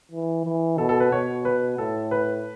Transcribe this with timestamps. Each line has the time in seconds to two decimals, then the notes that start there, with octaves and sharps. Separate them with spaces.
0.11 E3
0.45 E3
0.78 B2 A4
0.89 A4
1.00 B4
1.12 B2 C#5
1.45 B4
1.78 A2 A4
2.11 B4